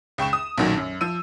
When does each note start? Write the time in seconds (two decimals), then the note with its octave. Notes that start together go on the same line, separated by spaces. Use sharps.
0.18 C#2 G5 C#6 E7
0.33 D#6
0.58 B1 F#2 A#2 D#3 F#3
0.77 F#2
1.01 F3 E6 D#7